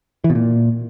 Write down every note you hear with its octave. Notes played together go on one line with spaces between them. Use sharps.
E3
B2
A#2